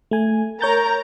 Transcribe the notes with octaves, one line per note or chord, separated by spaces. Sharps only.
A3 G#5
A#4 C#5 A#5 G6 A6